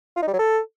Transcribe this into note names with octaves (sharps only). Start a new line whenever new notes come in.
F4
D#4
G3
F#3
A4